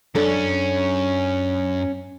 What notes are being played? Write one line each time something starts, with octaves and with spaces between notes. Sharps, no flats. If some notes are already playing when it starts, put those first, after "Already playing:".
F#2 C#4 D4 A4